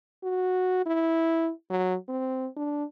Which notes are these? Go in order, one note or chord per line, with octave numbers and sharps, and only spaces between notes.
F#4
E4
F#3
C4
D4